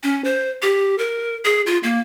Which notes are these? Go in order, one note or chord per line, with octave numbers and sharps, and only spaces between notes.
C#4
C5
G4
A#4
G#4
F4
A#3